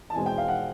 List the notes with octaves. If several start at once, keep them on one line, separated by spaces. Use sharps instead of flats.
A5
E2 B2 G#3 C4 G#5
G5
F5
F#5